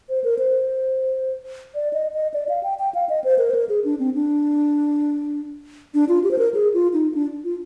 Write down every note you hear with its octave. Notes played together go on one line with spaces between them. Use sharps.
C5
A#4
C5
D5
D#5
D#5
D5
F5
G5
G5
F5
D#5
C5
A#4
C5
A#4
G#4
D4
C4
D4
D4
F4
G4
C5
A#4
G#4
F4
D#4
D4
F4